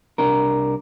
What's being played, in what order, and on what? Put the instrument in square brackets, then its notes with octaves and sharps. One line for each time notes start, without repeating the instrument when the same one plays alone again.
[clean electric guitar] C2 D4 A#4